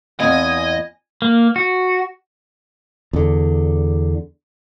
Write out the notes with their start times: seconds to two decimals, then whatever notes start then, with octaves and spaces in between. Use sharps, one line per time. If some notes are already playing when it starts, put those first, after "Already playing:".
0.20 E2 C4 D#5 F5 F#5 G#5
1.22 A#3
1.56 F#4
3.13 E2 D3